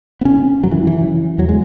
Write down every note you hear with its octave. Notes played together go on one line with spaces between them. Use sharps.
B3
C#3 C#4
F#2 F#3
E3
E3
C#3
E2 F#3
G#3